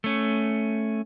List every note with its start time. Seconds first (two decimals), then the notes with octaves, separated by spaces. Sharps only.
0.04 A3 C#4